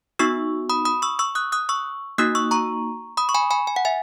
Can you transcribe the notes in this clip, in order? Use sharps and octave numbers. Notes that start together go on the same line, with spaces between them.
B3 D#4 F#4 C#6 E6
B5 D#6
B5 D#6
C#6 E6
C#6 E6
D#6 F#6
D#6 F#6
C#6 E6
A#3 D#4 F#4 D#6 F#6
C#6 E6
A#5 C#6
B5 D#6
C#6
G#5 B5
G#5 B5
G#5
F#5
E5 G#5